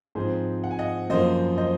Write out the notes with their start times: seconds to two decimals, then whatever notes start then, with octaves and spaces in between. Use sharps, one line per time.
0.15 G#2 F3 C4 G#4 C5
0.64 F#5
0.71 G#5
0.79 D#5 F#5
1.10 F#2 F3 A#3 C5 D#5
1.58 C5 D#5